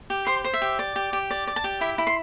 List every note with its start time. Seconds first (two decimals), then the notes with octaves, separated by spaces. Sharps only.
0.10 G4
0.27 C5 C6
0.44 C5
0.54 E5
0.62 G4
0.79 D5
0.96 G4
1.13 G4
1.31 D5
1.47 D5
1.56 A5
1.64 G4
1.81 E4 E5
1.98 E4
2.07 C6